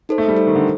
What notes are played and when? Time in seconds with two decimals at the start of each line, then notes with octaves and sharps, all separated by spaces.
0.09 D#4 A4 C5
0.18 A3
0.28 G3
0.37 D#4 A4 C5
0.47 D#3
0.55 D3